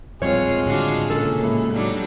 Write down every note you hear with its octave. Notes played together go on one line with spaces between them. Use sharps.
E1 A#1 G3 G#3 C4 F4 C#5
A2 D3 D#3 D4 F4 F#4
A#2 C#3 A4
A2 G#3 A#3 E4
F#3 G3 D4 D#4